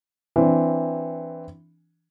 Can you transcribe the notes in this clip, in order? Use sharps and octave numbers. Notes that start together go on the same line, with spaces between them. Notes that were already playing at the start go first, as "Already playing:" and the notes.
E3 C4 D4